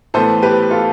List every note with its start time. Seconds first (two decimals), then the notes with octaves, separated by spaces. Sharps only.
0.14 A2 E3 B3 A4 C5
0.42 G4 B4
0.70 F4 A4